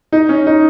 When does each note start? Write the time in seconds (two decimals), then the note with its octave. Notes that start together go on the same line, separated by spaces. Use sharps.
0.12 D#4
0.29 C#4
0.47 D#4